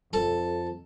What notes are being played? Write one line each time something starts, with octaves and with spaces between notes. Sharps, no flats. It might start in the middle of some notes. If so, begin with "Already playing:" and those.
F2 A4